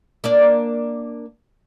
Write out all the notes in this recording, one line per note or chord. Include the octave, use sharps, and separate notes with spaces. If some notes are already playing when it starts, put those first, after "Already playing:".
A#3 D4 D5